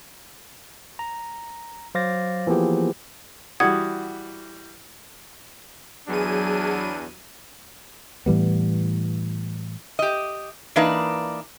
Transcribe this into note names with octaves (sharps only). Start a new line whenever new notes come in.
A#5
F#3 C5 F5 D6 A6 A#6
E3 F3 A#3 B3 G4 G#4
E3 G3 F#4 F#5 D#6 G#6
E2 F#3 D4 G#4 D#7
A2 E3 G3 B3
G4 D#5
E3 A#3 D4 D#4 B4